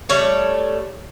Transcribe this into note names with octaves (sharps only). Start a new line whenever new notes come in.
G3 A3 C#5 D5